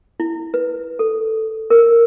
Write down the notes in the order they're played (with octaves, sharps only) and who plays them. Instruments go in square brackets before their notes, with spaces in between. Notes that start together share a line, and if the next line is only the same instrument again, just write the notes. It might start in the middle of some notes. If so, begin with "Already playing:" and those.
[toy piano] E4
B4
A4
A#4